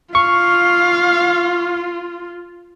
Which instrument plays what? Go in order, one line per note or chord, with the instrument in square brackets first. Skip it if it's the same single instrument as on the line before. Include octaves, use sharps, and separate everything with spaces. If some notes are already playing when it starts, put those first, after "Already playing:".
[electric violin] F4 [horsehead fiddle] F5 [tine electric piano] C#6